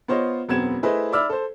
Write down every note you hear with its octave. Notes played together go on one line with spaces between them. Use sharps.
B3 F4 C5 C#5 D#5
E1 F#2 B3 C4 G#6 E7
A3 E4 G#4 B4 C5 D#5
D5 E5 B5 D6 E6 F6
A4 C5